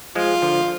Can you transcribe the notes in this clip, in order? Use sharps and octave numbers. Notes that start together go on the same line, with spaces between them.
F3 G#3 F4
D3 F3